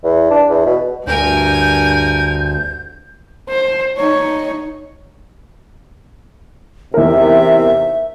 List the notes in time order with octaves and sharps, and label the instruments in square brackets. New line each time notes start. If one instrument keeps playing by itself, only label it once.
[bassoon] E2
D4
E2
B2
[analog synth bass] D2 [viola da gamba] G2 [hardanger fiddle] A#4 G#5 [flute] G6
[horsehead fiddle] C5
D#4 C#5
[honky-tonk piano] E2 D#4 A#4 [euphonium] C3 [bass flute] E5